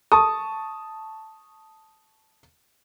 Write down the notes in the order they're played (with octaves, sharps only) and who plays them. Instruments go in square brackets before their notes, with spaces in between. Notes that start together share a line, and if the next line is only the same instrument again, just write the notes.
[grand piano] A5 C#6 D#6